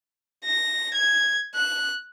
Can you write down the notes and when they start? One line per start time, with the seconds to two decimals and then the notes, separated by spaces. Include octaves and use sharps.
0.46 A#6
0.95 G#6
1.56 F#6